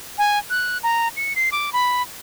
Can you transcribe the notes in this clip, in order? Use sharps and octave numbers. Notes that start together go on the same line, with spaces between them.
G#5
F#6
A#5
C#7
C7
D6
B5